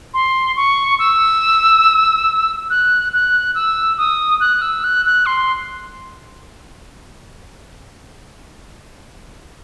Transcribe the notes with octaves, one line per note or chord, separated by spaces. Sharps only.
C6
C#6
E6
F#6
F#6
E6
D#6
F#6
E6
F#6
F#6
C6